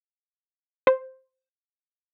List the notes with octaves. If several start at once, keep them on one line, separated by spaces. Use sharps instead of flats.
C5